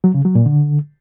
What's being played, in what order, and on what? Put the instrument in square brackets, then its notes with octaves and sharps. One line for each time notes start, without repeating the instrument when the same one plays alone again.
[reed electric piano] F#3
C#3
F#3
A#2
D3